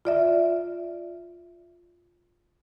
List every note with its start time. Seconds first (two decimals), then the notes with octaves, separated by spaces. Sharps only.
0.05 F4 D5 E5